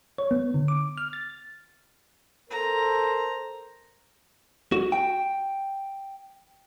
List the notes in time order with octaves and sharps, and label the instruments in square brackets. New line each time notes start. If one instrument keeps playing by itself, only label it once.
[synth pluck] C#5
B3
D3
D6
F6
A6
[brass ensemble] A4 A#4 C5 [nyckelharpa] A#5
[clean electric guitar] F#4
G5